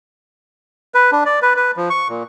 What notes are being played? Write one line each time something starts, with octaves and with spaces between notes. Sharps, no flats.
B4
D4
D5
B4
B4
F3
C#6
A#2